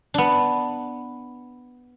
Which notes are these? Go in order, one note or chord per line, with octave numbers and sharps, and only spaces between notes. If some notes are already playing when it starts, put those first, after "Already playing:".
B3 D4